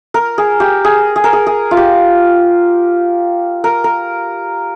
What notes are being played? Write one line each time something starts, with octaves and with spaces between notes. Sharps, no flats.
A#4
G#4
G4
G#4
G#4
A#4
G#4
G#4
F4
G4
A#4
A#4